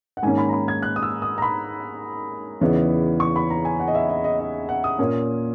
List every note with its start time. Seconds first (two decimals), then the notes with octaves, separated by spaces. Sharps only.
0.17 F#5
0.23 G#2 D#3 A#3 C#4 G#5
0.38 B5
0.49 A#5
0.53 B5
0.68 G#6
0.82 F#6
0.96 D#6
1.03 E6
1.22 D#6
1.38 A#5
1.42 B5
2.61 E2 C#3 E3 B3 D#4
3.20 C#6
3.36 B5
3.50 A#5
3.65 G#5
3.80 F#5
3.88 D#5
3.95 E5
4.09 D#5
4.24 D#5
4.40 D#5
4.69 F#5
4.84 D#6
4.99 A#2 A#3 C#4